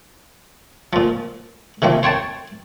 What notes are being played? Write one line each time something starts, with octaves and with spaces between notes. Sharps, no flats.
A#2 F3
C3 D#3 F3 A#3
C5 C#5 G5 A5